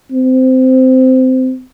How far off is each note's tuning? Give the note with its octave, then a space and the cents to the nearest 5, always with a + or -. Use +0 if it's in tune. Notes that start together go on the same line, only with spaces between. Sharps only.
C4 -15